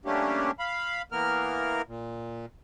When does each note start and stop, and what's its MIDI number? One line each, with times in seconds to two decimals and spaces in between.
0.05 0.51 55
0.05 0.51 57
0.05 0.51 58
0.05 0.51 61
0.05 0.51 62
0.05 0.51 67
0.59 1.02 77
0.59 1.02 83
1.12 1.82 52
1.12 1.82 58
1.12 1.82 59
1.12 1.82 70
1.12 1.82 89
1.87 2.46 46